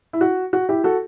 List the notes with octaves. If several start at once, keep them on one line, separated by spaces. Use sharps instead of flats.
E4
F#4
F#4
E4 G4
F#4 A4